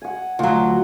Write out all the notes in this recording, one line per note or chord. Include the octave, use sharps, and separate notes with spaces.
F#5 G#5
D2 F#3 F4